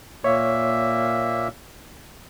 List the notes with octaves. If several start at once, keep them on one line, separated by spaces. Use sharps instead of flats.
A#2 A#3 C#5 E5